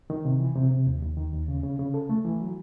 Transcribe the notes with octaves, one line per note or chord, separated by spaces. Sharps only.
D#3
C3
E3
C3
C3
D#2
D#2
D#3
D#2
C#3
C#3
C#3
A4
A3
E3
F#3